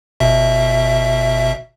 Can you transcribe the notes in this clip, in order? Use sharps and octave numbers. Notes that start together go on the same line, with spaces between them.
G1 B2 E5